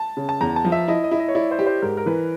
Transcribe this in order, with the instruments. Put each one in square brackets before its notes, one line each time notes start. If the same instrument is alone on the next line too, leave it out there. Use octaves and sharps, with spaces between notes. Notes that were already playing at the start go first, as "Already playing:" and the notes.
Already playing: [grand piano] A5
[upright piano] C#3
[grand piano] A5
[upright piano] E2 [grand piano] A#5
[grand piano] A5
[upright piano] F3
[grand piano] E5
[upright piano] E4 [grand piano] D#5
[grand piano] D#5
[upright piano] E4
[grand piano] D#5
C#5
[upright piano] E4 [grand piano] D5
[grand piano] C5
[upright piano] G4
[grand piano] C5
[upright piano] G#2 [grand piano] A#4
[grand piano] A#4
[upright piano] E3 [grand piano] B4